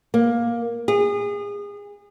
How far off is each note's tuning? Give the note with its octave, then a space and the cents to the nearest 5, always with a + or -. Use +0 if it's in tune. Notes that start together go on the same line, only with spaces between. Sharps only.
A#3 +10
G#4 -30